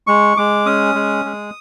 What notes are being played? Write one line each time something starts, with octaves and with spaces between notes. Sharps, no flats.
G#3 C#6
G#3 D6
C#4 D#6
G#3
G#3